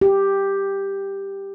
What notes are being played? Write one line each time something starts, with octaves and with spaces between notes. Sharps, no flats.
G4